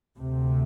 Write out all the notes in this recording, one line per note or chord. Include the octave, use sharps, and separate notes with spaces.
D2 C3